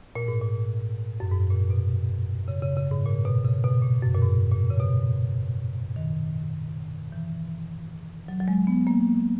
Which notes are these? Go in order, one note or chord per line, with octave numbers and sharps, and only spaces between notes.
A#2
G#2
A#2
F#2
G#2
A#2
B2
C#3
C#3
C#3
G#2
A#2
B2
C#3
B2
A#2
F#2
A#2
G#2
A#2
C#3
B2
D#3
E3
F#3
F#3
G#3
B3
A#3